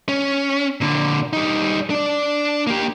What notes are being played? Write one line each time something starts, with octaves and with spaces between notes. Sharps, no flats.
C#4
A#2 D3
G3 D#4
D4 D5
A#3 G4